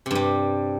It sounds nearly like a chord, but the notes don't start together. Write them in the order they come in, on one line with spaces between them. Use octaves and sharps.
C3 G2 G3